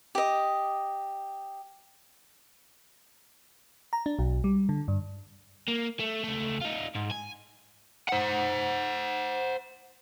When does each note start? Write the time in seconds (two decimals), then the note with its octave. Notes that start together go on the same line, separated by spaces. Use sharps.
0.15 G4 D#5
3.93 A#5
4.06 D4
4.19 B1
4.44 G3
4.69 D3
4.88 G2
5.68 A#3
5.99 A3
6.24 C#2 A3
6.62 D#4 F4
6.95 G#2
7.12 G#5
8.09 C5 F#5